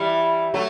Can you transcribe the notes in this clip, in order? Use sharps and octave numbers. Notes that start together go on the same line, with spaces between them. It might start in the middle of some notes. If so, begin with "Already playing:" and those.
Already playing: E3 G3
F#3 A3